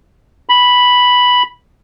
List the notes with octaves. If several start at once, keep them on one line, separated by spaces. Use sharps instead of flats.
B5